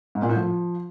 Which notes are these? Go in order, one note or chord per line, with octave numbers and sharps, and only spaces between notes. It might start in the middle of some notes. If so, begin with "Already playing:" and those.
G#2
A#2
A2
F3